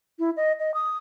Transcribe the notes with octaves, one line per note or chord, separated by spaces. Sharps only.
E4
D#5
D#5
D#6